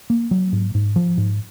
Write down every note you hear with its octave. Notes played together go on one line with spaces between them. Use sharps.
A#3
F#3
G#2
G#2
F3
G#2